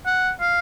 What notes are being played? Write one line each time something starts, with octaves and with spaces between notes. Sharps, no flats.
F#5
F5